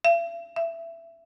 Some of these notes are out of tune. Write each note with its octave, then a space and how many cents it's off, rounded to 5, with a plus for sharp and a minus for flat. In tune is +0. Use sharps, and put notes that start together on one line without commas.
E5 +45
E5 +20